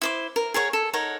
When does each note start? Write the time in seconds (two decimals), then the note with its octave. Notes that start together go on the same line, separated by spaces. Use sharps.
0.02 E4 C5 D6
0.36 A#4
0.54 G#4 A#4 C#5 F#5
0.73 A4
0.93 D#4 A#4 C#5 F#5